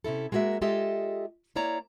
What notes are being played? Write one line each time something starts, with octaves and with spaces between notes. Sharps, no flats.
C3 C#4 E4 A4
G#3 A#3 F#4 A#4 E5
G#3 F4 G4 A4 D#5 E5
A#3 E4 C#5 D5 A#5